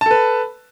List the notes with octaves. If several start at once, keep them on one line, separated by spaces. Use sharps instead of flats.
A4 B4 A5